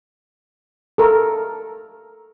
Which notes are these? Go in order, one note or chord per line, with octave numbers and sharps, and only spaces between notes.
A4 A#4